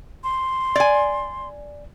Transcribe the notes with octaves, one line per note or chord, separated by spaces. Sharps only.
C6
D5 G#5